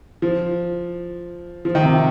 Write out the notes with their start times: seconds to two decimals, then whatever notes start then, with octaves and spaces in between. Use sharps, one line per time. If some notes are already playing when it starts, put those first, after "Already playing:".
0.22 F3
1.65 F3
1.75 D#3
1.83 C3